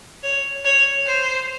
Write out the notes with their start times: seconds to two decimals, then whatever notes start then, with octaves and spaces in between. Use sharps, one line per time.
0.23 C#5
0.65 C#5
1.07 C5